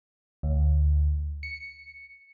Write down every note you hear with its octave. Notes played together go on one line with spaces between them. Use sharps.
D2
C#7